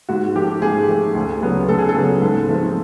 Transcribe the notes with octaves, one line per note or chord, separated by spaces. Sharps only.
G#2 F#4
F3 A3 G4
G#2 G#4
F3 A3
D2
C#3 F#3 B3
D2 A4
G#4
A4
C#3 F#3 B3
G#2
F3 A3 C4